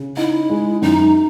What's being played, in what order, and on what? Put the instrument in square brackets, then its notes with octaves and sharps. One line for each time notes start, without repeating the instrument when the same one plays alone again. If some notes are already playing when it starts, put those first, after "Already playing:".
Already playing: [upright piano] C#3
[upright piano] D#4 [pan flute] E4
[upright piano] G#3
[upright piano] F#2 [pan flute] D#4